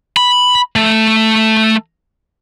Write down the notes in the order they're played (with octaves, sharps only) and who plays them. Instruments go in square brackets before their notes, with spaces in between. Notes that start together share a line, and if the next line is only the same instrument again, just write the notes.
[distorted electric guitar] B5
A3